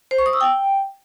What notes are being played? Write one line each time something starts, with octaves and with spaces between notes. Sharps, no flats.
C5
C#6
D#6
E6
G5